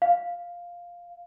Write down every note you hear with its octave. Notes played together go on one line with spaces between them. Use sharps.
F5